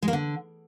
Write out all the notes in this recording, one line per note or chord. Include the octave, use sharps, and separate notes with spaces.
G#3
A#3
D3